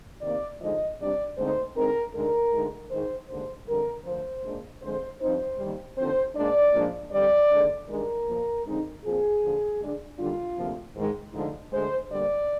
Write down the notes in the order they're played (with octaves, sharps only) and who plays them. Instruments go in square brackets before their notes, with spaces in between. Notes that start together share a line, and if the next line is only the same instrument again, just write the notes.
[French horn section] C3 D#3 A#3 D5
D3 F3 G#3 D#4 D#5
C3 G3 D4 D5
D2 D3 G#3 C4 D#4 C5
D3 G#3 C4 D#4 A#4
D2 D3 G#3 D#4 A#4
D2 D3 G#3 D#4
G#2 D#3 G#3 D#4 C5
D#2 D3 G#3 C5
F2 D3 G3 A#4
D2 D3 F3 C5
A#2 G#3 D4
F2 D3 G#3 C5
G2 F3 C4 D#4 C5
D#2 D#3 G3
D#2 D3 F3 C4 C5
A#2 G#3 D4 D5
A#2 F3 G#3 D4
F2 D3 G3 D5
D#2 D3 G#3 D4
G2 D#3 G#3 D4 A#4
A#2 F3 A#3
F2 D3 G#3 C4 D#4
A#2 F3 C4 G#4
D#2 D3 F3
D3 G#3 D4
D#2 D3 G3 D4 F4
D2 C3 F3 A#3
G#2 D#3 G#3
D2 D3 F3 G#3 D#4
D2 D3 G#3 C5
D3 G3 A#3 D5